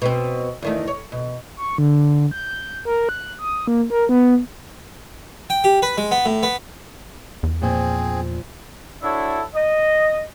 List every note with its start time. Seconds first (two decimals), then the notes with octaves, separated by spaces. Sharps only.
0.02 B2 C4
0.62 E2 D#3 A3
0.88 C#5
1.12 B2
1.57 C#6
1.78 D3
2.31 G6
2.85 A#4
3.09 F#6
3.39 D#6
3.67 A#3
3.90 A#4
4.09 B3
5.50 G5
5.64 G4
5.82 B4
5.98 G#3
6.11 B3
6.25 A2
6.43 B3
7.43 E2
7.62 A#2 F3 C4 G#4
9.03 D4 E4 F#4 A4 C#5 E5
9.55 D#5